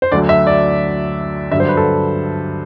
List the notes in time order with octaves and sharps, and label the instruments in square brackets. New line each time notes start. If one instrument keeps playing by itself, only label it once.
[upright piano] C5
D2 D3 F#3 D5
E5
D5
G2 D3 F#3 E5
C5
B4
A4